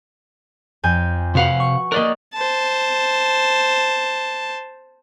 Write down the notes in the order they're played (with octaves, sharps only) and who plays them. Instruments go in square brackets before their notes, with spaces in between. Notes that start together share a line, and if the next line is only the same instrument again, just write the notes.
[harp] F2 G#5 G6
[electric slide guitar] C3 F5 F#5 [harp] F#4 B4
[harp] C#6
[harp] A#3 F#6 [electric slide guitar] A#4 D5 D#5
[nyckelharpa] C5 A5